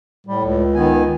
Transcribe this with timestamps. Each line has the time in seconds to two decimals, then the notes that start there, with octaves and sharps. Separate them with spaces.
0.27 A2 G3
0.45 C#2
0.75 D#3 B3 G#5